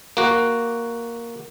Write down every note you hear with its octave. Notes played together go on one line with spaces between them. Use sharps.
A#3 F#4